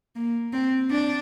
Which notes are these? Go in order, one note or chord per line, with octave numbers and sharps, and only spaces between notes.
A#3
C4
D4